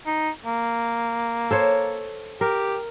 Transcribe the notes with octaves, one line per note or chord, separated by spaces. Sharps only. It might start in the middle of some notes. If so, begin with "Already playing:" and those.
D#4
A#3
A4 C5 C#5
G4 A#4